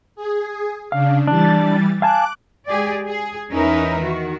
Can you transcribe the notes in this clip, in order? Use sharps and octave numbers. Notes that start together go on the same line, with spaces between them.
G#4
C#3 D4 F5
E3 G3 D4 A6
F5 G#5 A5 D6 F#6
G#3 G4 G#4 D5
G#4
E2 C#4 D#4 A#4 B4 E5
D#3 F#4